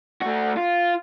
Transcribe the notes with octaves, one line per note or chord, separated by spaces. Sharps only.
A3 F#4
F4